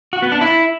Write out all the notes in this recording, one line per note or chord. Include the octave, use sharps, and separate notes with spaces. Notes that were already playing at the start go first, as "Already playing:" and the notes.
F#4
B3
D4
E4